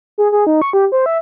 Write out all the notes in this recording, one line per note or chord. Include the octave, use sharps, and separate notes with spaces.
G#4
G#4
D#4
C#6
G4
C5
E5